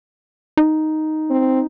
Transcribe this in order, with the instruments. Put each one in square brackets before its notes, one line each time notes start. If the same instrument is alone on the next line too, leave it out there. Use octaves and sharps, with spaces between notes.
[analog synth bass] D#4
[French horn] C4